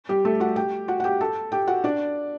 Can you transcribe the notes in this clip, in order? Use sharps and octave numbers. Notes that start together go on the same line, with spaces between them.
G3 G4
A3 A4
F#4 F#5
G4 G5
F#4 F#5
F#5
G4 G5
A4 A5
G4 G5
F#4 F#5
D4 D5